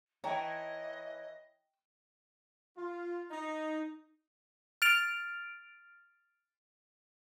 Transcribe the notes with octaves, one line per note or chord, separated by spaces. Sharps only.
E3 C#5 D#5 G5 A5 A#5
F4
D#4
F6 A6 D7 F7